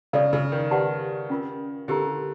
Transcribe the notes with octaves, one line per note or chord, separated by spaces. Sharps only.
C#3 A4 D5 F5
C#3
D#3
G4 B4 D5 F#5 A5
C#4 F4 A#4
D3 E4 G4 A#4